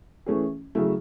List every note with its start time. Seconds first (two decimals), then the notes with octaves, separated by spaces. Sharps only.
0.26 E3 A3 C#4 G#4
0.75 C#3 F#3 A3 E4